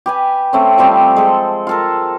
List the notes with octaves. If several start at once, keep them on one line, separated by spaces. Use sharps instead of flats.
G4 B4 G#5
A3 C4 C#4
F3 G3 C4 G4
G#3 A4
F4 A4 A#4